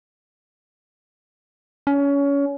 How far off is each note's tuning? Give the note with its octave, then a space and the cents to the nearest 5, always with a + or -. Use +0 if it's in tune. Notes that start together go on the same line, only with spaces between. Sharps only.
C#4 +25